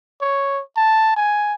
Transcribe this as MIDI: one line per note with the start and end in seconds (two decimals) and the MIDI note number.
0.21 0.62 73
0.77 1.16 81
1.16 1.54 80